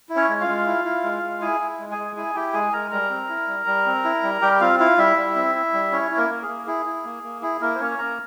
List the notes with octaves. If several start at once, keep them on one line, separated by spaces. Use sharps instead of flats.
E4
C#4 C#5
G#3
F4 F5
G#3
E4
E4
G#3
G#3
E4 G#4 G#5
E4
G#3
G#4 G#5
G#3
E4 G#4 G#5
E4 G4 G5
G#3 G#4 G#5
G#3 A#4 A#5
G3 A#4 A#5
C4
E4
G3
G3
C4
E4
G3
G3 G4 G5
C4 F4 F5
E4 F4 F5
G3 E4 E5
G3
C4
E4
G3
C#4 E4 C#5
E4
A#3 A#4
A#3
G#4
A#3
E4 G#4
E4
A#3
A#3
E4 G#4
A#3 E4 A#4
C5
A#3 C#4 C#5
A#3 A#4 A#5